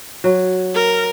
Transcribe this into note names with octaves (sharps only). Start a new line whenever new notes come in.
F#3
A#4